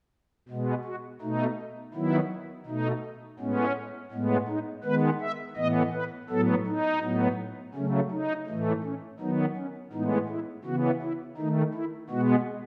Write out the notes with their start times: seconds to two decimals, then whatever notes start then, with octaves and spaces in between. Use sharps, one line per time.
0.49 B2 G#3 B3
0.85 F#4
1.21 B2 A3 D#4
1.94 D#3 F#3 B3 E4
2.66 B2 A3 D#4
3.39 A2 G#3 B3 C#4
4.12 A2 G#3 B3
4.48 D#4
4.84 D#3 G#3 B3 B4
5.21 E5
5.57 A2 E3 B3 D#5
5.93 B4
6.29 A2 F#3 B3 A4
6.66 D#4
7.01 A2 F#3 B3
7.74 C#3 F#3 A3 C#4
8.11 D#4
8.47 A2 E3 A3
8.83 C#4
9.20 D#3 F#3 B3 D#4
9.56 C#4
9.93 A2 E3 G#3 B3 D#4
10.29 E4
10.64 C#3 E3 B3 F#4
11.02 E4
11.37 D#3 A3 D#4
11.74 E4
12.09 B2 G#3 B3 F#4